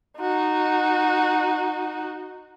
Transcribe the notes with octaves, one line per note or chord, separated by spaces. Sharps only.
D#4 F#4